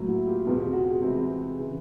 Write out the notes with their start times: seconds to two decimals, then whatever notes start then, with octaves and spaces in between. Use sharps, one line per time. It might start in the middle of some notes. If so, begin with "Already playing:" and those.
Already playing: A2 F#3 A#3
0.08 E4 F#4
0.27 F4 G4
0.45 E2 B2 G3 C4 F4 G4
0.73 F#4 G#4
1.02 C3 E3 G#3 C4
1.58 C#3 E3